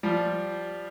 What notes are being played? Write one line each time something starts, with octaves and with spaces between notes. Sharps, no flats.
F3 G3